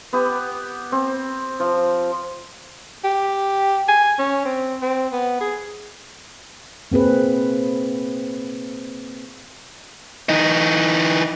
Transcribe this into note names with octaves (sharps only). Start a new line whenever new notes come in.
B3 G4
C4
F3
G4
G#5
C#4
C4
C4
B3
G#4
A#3 C4 G#4 B4
E3 D#4